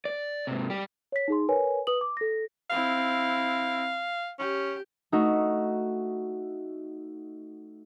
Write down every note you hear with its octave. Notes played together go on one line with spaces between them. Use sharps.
D5
G#2 C3
G3 G4
C#5 B6
D#4 G#4 C6
A#4 B4 C#5 G#5
B4 D#6 F#7
D6
A4 A#6
C4 E4 F5
C#4 G4
A3 D#4 F#4